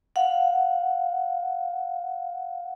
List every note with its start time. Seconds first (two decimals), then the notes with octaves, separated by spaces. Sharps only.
0.16 F5 F#5